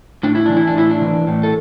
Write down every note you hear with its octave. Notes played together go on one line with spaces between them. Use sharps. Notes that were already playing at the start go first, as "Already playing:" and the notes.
A2 D4
E4
E3 D4
E4
D4
A2 E4
D4
E3
A2
A4